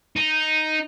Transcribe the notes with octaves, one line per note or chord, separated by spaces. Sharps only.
D#4